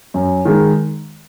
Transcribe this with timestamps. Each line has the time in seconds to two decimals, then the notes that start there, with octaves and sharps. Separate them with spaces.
0.14 F#2
0.45 D#3 G#3